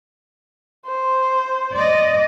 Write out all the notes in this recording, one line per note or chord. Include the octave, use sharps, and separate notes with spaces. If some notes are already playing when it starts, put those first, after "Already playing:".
C5
D5 D#5